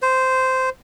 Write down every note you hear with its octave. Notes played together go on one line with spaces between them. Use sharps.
C5